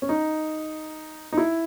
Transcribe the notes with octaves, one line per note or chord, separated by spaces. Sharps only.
C#4
D#4
D#4
E4